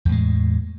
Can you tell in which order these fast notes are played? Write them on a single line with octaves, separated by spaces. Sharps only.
E2 A2 G#3